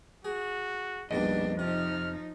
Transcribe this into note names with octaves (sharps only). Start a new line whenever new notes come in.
F#4 G#4
A#1 F2 B2 G3 D4 D#4 D#5
C3 F3 D#4 F6